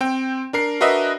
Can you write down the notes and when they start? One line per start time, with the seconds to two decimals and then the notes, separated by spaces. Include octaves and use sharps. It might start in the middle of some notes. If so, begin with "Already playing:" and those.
0.01 C4 G5
0.53 D4 A#4 C7
0.80 D4 F#4 A#4 B4 D#5 E5